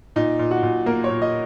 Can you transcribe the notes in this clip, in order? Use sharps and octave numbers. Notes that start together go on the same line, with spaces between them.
A#2 D#4
A#2
F#4
A#2
A#3 A#4
C#5
A#2
D#5